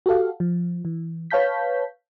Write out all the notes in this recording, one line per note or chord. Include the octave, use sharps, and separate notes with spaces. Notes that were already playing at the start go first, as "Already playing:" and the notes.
F#4 G4 A4 F5
F3
E3
B4 C#5 F5 A5 G6 B6